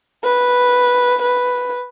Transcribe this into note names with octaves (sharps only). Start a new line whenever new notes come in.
B4
B4